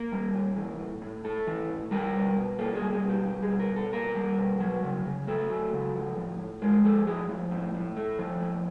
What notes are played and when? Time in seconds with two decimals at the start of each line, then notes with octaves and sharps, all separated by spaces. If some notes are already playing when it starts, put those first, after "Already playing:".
Already playing: A#3 A#4
0.12 G3
0.35 A#2
0.57 E3
0.79 A2
1.02 A2
1.24 A3 A4
1.47 E3
1.69 A2
1.91 G3 A#4
2.14 B2
2.36 B2
2.58 A#3 A4
2.75 G#4
2.81 G3
2.93 G#4
3.03 B2
3.09 G4
3.26 G3 G4
3.43 G#4
3.49 B2
3.60 A#4
3.71 B2
3.76 A4
3.93 A#3 A#4
4.15 G3
4.38 B2
4.60 F#3
4.83 C#3
5.05 C#3
5.27 A3 A4
5.50 F#3
5.73 C#3
5.94 F3
6.17 A2
6.40 A2
6.62 G#3 A#4
6.84 F3 A4
7.07 A2 G#4
7.29 F3
7.51 A2
7.74 A2
7.97 A3
8.19 F3
8.41 A2